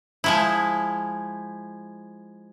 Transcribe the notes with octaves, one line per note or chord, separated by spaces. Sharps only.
F3 G#3 E4